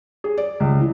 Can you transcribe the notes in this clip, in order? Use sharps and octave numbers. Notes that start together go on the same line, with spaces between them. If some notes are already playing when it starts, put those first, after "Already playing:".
G#4
D5
C#2
E3